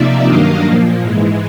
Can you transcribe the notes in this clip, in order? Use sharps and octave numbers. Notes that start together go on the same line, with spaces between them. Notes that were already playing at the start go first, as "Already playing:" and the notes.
Already playing: C3 F3 A#3 D#4 D5 E5
G2 D#3 F#3 A#3 D4 D#5 F5
A#2 F3 A#3
G#2 E3 G#3